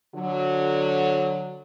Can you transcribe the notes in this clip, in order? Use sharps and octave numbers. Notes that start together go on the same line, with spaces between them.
D3 F#3